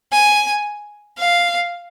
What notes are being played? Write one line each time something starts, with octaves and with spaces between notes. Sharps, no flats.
G#5
F5